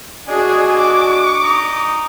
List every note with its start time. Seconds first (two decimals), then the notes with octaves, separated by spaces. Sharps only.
0.28 D4 F#4 G#4 D#5
0.79 D6
1.43 A#5 D#6